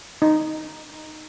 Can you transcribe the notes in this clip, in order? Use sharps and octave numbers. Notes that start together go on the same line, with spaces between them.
D#4